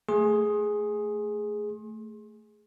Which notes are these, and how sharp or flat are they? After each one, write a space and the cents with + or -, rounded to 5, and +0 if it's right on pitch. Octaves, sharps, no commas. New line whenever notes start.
A3 +0 G#4 +0 C6 +35